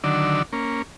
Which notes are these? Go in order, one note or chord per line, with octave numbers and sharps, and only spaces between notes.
D3 D#3 F#3 D5 E6
A#3 C#4